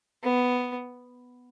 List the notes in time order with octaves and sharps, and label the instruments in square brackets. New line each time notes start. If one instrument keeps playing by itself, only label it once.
[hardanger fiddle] B3